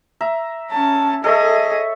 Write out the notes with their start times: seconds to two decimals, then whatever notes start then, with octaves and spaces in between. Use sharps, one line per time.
0.21 E5 A#5
0.71 C#4 A5
1.24 G#4 A4 C#5 D#5 E5